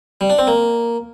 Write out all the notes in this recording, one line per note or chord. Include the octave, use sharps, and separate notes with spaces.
G3
D4
C4
A#3